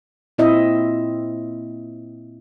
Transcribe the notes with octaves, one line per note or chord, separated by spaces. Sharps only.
A#2 C4 E4 D#5 E5